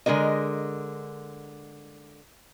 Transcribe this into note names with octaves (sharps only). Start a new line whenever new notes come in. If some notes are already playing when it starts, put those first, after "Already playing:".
D3 G#3 F4 A#4 D#5